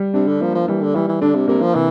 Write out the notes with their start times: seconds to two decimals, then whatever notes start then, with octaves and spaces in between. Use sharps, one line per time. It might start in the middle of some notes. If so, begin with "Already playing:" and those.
Already playing: G3
0.14 C3 D4
0.27 D3
0.41 F3 A#3
0.55 F3
0.68 E3 G3
0.81 D3
0.95 E3 G3
1.08 E3
1.21 D3 D4
1.35 C3
1.48 C3 A#3
1.61 F3
1.75 C3 E3